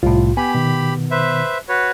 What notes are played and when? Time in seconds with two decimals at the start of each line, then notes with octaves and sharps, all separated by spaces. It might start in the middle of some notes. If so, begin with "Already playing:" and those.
0.03 C2 A2 F4
0.37 B3 G4 G#5 B5
0.55 B2 D#3
1.11 B4 C5 E5
1.69 F#4 B4 C#5